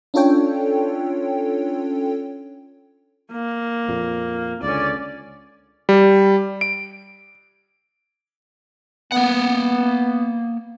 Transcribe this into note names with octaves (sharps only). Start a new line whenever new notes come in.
C#4 D4 F4 A4 C#5 G5
A#3
F2 A#2
C#2 D3 C#4 D5
G3
D7
A#3 B3 F#5